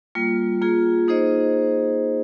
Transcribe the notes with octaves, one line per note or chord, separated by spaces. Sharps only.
G3 A#3 F4
A#3 F4 G#4
A#3 D#4 G#4 C5 D#5